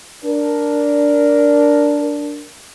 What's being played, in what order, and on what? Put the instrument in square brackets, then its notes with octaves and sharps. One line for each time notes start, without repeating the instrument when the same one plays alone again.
[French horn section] D4 A#4